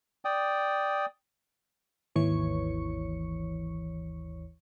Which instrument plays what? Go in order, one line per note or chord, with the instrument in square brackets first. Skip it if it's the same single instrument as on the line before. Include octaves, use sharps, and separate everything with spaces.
[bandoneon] D5 G5 D#6
[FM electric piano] G#1 D#2 E3 C#5 C#6 C#7